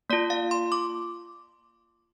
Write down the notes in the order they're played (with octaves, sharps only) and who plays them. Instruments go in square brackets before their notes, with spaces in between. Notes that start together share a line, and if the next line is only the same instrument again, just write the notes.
[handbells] A#3 F4 D5
F5
C6
D6